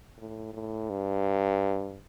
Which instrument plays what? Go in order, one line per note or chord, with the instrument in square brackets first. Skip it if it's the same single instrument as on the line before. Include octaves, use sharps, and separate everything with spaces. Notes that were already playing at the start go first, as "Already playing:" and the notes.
[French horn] A2
A2
G2